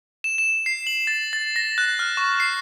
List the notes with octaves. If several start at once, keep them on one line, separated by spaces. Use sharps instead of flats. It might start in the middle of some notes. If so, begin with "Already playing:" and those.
E7
E7
C7
F#7
A6
A6
A#6
F#6
F6
C#6
C7